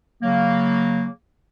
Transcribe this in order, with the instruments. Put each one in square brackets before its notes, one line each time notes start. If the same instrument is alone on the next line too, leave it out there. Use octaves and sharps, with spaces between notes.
[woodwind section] C#3 F#3 A#3